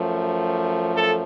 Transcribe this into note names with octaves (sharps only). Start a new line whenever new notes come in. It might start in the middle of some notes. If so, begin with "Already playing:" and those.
Already playing: F#2 F3 A3
A4